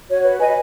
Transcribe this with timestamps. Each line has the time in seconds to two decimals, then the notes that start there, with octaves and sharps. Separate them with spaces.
0.09 F#4 C#5
0.25 B4
0.40 B4 D#5 G#5